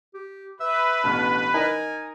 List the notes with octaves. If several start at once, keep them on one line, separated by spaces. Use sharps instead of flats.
G4
B4 E5
A1 B2 D4 F6
D#4 A#4 G#5